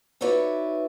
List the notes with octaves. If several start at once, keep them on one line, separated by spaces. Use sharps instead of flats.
D#4 E4 F#4 B4 C#5 D5